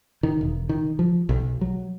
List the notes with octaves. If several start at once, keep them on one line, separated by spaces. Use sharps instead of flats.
D#3
E1
D#3
F3
B1
F#3